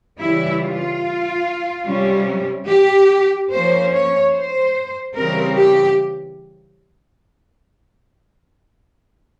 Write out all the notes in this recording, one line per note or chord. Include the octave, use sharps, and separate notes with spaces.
C#3 E3 G3 E4
F4
C3 G3 C#4
G4
F3 A#3 C#4 C5
C#5
C5
C#3 E3 G3 C4 A#4
G4